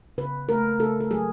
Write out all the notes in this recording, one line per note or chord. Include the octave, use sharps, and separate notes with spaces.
C#3 B4
A3 A#4
C#3 A4
A4
F#3 G#4